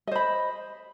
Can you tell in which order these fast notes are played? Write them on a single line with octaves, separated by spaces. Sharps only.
D#5 C5 B5